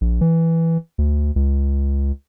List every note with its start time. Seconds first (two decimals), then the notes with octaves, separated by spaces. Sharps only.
0.01 A#1
0.21 E3
0.98 D2
1.36 C#2